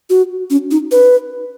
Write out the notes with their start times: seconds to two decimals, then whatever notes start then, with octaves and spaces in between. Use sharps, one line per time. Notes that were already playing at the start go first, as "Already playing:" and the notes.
0.10 F#4
0.50 C#4
0.71 D#4
0.91 B4